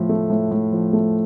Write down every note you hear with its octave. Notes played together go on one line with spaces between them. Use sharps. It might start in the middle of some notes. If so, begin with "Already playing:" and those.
Already playing: A2 F3
A3
A2
A2
F3
A3